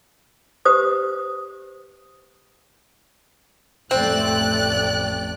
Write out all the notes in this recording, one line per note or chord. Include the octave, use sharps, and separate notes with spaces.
G4 B4 C5 D#6
A1 F2 A3 C4 D5 F#6